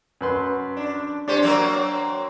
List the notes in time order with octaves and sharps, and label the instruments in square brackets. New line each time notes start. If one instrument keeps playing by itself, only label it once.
[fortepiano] F#2 B4 C6
[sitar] D4
[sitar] C#4 G4 C5 [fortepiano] D4
[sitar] F#3 A#3 C4